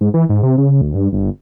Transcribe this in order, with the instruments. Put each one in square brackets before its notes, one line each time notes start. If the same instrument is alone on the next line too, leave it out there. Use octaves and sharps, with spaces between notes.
[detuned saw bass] G#2
E3
G#2
C3
C#3
D2
G2
G1